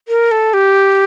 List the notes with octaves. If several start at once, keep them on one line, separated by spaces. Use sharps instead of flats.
A#4
A4
G4